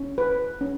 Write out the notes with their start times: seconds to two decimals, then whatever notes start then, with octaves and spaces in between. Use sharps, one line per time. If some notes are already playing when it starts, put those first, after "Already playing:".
Already playing: C#4
0.18 B4
0.61 C#4